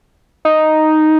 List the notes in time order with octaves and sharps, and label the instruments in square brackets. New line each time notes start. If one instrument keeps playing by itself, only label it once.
[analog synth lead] D#4